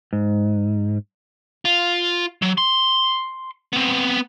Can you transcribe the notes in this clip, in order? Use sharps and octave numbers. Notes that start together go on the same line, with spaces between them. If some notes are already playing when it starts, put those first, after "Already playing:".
G#2
F4
F#3
C6
B3 C4